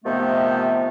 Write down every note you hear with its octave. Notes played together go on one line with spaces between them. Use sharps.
C3 D#3 F3 A3 B3